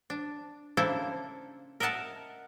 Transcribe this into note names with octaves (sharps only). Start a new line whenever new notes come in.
D4
C#3 A#3 D4 E4 A4 C5
A#4 D#5 E5 F#5 A5